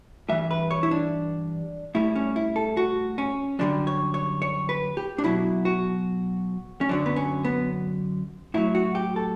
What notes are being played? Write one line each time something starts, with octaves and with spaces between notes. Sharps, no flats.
G2 E3 G3 E5
B4
C#5
E4
D4
A2 G3 E4
C#4
E4
A4
F#4
C#4
F#2 D3 G3 D4
C#5
C#5
C#5
B4
G4
D4
B2 F#3 E4
F#4
C#4
F#2 D3 F#3 D4
B3
C#4
B3
A2 F#3 E4
F#4
G4
A4